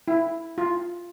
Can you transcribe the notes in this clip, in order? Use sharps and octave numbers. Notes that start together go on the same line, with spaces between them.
E4
F4